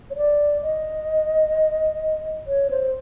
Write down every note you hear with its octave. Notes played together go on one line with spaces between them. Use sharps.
C#5
D5
D#5
C#5
C5